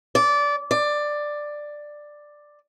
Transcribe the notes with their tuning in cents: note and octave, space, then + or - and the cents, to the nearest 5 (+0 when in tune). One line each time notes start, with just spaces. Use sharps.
D5 -20
D5 +10